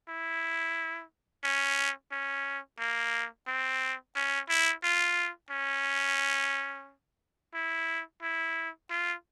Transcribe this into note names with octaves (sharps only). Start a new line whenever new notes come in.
E4
C#4
C#4
A#3
C4
C#4
E4
F4
C#4
E4
E4
F4